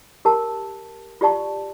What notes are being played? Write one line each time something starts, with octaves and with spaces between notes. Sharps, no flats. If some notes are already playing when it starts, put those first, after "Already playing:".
G4 A#4 A5
F4 G4 D5 A5 C#6